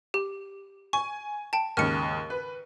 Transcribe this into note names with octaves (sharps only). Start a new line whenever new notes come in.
G4
G#5 C#6
G5 A5
D#2 G#2 C#3 F6 C#7
B4